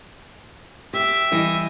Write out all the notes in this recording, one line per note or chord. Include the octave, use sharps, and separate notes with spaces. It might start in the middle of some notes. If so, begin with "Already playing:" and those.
G4 E5
E3 G3 D#5